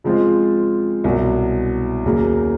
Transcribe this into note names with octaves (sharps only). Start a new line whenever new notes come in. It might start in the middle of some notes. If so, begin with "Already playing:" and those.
C#3 F3 G#3 C4 F4
C2 B2 F#3
D#2 C#3 F#3 A#3